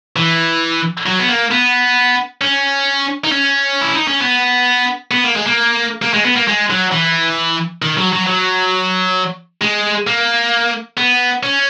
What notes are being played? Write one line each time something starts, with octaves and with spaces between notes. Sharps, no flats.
E3
F#3
B3
A#3
B3
C#4
D#4
C#4
E4
D#4
C#4
B3
B3
A#3
G#3
A#3
A#3
G#3
B3
A#3
G#3
F#3
E3
D#3
F#3
F#3
F#3
G#3
A#3
B3
C#4